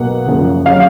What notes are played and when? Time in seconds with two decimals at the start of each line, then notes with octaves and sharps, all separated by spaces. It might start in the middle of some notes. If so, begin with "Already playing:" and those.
Already playing: B1 B2 A#3 F#5
0.27 F#1 F#2 F3 A#3
0.65 C#3 F#3 F5